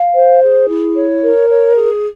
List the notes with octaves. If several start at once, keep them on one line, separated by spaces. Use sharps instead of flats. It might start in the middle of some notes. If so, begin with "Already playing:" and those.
Already playing: F5
C5
G#4
E4
C#5
A#4
C#5
G#4